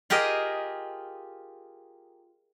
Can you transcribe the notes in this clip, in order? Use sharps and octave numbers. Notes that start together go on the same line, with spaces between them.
F4 G4 G#4 A#4 D#5